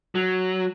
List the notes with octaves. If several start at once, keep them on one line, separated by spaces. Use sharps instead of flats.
F#3